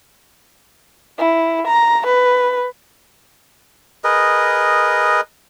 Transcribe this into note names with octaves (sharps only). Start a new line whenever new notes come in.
E4
A#5
B4
G#4 A#4 B4 D#5